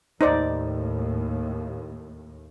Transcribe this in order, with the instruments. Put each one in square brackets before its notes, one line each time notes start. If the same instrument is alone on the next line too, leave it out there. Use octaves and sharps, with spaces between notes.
[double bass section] D#2 A2 [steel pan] D#4 C5 D5